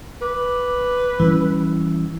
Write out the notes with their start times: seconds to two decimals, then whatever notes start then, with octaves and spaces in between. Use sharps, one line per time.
0.22 B4 D6
1.20 E3 G3 C#4 E4